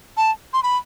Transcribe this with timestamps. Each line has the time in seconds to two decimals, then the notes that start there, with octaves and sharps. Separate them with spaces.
0.17 A5
0.53 C6
0.63 B5